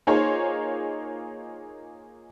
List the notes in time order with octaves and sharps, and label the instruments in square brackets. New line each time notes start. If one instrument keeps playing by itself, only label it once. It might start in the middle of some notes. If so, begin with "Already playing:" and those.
[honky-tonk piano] A#3 D#4 F4 G#4 C5 C#5